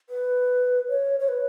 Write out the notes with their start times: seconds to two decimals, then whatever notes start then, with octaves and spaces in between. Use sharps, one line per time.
0.10 B4
0.89 C#5
1.20 C#5
1.28 B4